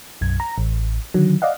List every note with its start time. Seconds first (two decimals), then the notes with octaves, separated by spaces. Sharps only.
0.21 B1 F#2 G#6
0.40 A#5
0.58 A1
1.14 D3 D#3 F#3
1.42 D5 D#5 F5 F#5